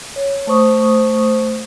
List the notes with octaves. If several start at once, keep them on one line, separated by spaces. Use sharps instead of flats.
C#5
A3 C5 C#6 D#6